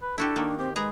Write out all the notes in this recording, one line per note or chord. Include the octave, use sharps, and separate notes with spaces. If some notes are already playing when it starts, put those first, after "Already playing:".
B4
D4 E4 F#4 G4 A4
D#3 A#3
C4 G4
G#3 G#4 B4 A#5